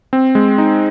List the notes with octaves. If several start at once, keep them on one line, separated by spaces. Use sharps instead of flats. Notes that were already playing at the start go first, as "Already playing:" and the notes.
C4
G#3
D#4